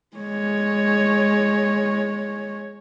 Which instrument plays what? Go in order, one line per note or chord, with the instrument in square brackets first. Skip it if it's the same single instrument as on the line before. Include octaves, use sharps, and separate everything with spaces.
[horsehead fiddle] G#3 C#5